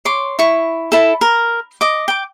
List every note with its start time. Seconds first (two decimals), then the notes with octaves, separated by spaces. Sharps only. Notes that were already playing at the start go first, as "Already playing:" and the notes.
0.05 C#5 C6 D6
0.39 E4 C#6
0.92 E4 A4
1.21 A#4
1.81 D#5 D6
2.08 G5 D6